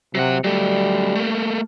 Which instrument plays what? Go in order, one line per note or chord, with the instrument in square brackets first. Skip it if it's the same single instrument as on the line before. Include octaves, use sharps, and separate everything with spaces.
[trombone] C3 [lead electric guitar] F#3 F#5
[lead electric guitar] F#3 A3 [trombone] G3
[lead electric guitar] A3 A#3